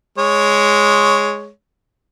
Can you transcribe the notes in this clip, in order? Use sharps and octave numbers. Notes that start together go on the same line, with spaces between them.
G#3 C#5